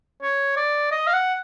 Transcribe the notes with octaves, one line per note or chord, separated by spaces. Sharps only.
C#5
D5
D#5
F5
F#5